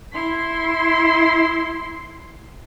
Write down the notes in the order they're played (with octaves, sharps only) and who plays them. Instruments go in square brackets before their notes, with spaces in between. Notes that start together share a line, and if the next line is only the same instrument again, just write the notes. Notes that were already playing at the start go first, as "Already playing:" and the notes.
[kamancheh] E4 C6